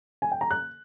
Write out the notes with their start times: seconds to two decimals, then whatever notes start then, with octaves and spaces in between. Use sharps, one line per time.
0.22 G#5
0.32 G5
0.41 A#5
0.51 F#6